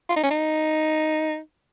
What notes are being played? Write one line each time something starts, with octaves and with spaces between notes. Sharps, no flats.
F4
D#4
C#4
D#4